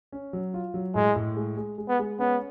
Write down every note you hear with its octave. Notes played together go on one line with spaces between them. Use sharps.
C#4
F#3
F4
F#3
A2 G#3
A2
G#3
G#3
G#3
B3
G#3
B3 C#4